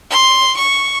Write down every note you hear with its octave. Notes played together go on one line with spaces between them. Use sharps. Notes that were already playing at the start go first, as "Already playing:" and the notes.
C6
C#6